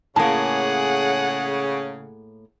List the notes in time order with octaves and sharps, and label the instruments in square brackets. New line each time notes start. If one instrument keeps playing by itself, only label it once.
[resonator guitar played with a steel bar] A2 A#3 [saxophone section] C#3 [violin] G#4 F#5 [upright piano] A5